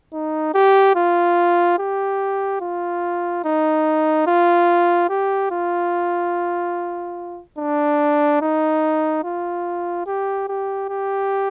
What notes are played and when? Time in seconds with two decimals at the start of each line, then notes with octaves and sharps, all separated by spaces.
0.14 D#4
0.54 G4
0.96 F4
1.79 G4
2.61 F4
3.45 D#4
4.27 F4
5.10 G4
5.51 F4
7.58 D4
8.41 D#4
9.24 F4
10.07 G4
10.48 G4
10.89 G4